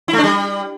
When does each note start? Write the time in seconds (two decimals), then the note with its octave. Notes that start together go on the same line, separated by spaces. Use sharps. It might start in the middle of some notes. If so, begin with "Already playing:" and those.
0.08 E4
0.13 A3
0.18 D4
0.24 G3